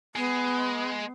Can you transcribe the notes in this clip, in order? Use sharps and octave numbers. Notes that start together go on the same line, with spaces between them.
G#3 B3